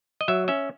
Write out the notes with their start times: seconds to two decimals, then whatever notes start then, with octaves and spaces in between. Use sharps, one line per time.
0.21 D#5
0.28 F#3 E5
0.48 C#4 E5